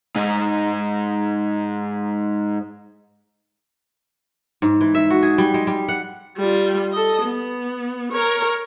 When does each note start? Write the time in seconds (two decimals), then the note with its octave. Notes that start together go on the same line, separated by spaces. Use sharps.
0.16 G#2 D#4
4.62 G#2
4.81 E3
4.95 E5
5.10 F#4
5.23 G#4
5.38 G3
5.54 G#3
5.67 G3
5.88 F#5
6.37 G3 F4
6.93 A4 D#5
7.22 B3
8.12 A#4 C#5